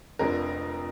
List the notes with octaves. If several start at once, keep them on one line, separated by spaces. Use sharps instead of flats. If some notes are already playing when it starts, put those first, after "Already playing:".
F1 F2 D3 A#4